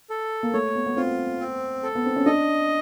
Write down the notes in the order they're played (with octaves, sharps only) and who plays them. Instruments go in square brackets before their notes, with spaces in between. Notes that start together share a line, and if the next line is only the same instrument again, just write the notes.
[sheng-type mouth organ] A4
[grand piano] A#3
[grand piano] A3 [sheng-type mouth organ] C#5
[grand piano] B3
B3
[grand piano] C4 [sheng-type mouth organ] F4
[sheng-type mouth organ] C4
A4
[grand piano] B3
C4
C#4
[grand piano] D4 [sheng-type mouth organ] D#5